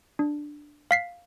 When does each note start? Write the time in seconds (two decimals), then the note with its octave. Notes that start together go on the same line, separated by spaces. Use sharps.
0.19 D4
0.91 F5 B6 C7